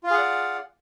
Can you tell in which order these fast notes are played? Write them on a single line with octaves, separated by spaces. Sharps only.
F4 F5 G#4 F#5 D5